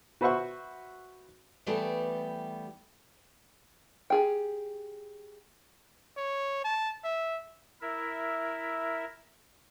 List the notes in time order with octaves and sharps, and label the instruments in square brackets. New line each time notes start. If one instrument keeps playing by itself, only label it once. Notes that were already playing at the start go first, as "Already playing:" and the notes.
[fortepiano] F#4 B4 C5 E5 F#5 C#6
[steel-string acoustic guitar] E3 G3 A3 B3 G4
[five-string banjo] G4 G#4 G5
[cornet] C#5
A5
E5
[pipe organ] E4 A#4 E5